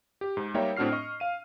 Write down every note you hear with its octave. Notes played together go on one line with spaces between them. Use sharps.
G4
G#2
G3 A#3 D#4 C#5 E5 G5
A2 C4 D4 F#4 F6 C7
D#5 C#6
F5 D#7